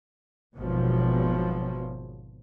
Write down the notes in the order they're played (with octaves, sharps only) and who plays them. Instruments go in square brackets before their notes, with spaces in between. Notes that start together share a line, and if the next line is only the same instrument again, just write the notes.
[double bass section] G#1 E2 B2 F3 F#3